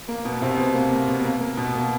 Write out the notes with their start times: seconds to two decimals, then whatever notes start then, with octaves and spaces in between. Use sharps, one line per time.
0.08 A#3
0.25 B2 B3
0.41 C3 C4
0.58 B2 B3
0.74 A#3
0.92 A#3
1.07 B2 B3
1.24 A#3
1.40 A#3
1.57 B2 B3
1.75 A#3